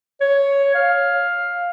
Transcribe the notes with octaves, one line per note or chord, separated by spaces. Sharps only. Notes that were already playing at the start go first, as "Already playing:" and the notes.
C#5
F5